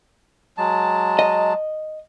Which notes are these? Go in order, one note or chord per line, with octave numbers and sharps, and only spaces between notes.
F#3 G#3 A5
D#5